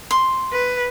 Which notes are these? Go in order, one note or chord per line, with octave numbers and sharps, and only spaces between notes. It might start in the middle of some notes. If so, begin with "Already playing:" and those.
C6
B4